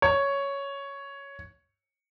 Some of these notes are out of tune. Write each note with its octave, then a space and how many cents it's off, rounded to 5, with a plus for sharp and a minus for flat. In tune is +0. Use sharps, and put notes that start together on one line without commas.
C#5 +5